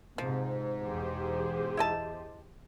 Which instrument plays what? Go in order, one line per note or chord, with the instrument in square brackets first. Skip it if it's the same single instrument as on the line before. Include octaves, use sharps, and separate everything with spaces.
[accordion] G#2 [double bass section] C3 [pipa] F3
[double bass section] E2 B2 [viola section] G4 G#4 C5
[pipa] E4 D#5 A5